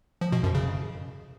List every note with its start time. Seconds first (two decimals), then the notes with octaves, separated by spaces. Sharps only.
0.21 F3
0.32 B2
0.43 F#2
0.55 C#3